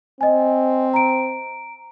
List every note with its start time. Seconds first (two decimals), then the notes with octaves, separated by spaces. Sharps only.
0.21 C4 D#5 G#5
0.94 A#5 D7